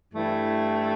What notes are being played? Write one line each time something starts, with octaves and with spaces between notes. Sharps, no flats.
G2 E3 A3 E4